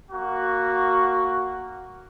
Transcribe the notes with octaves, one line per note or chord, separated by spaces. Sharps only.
A#3 F#4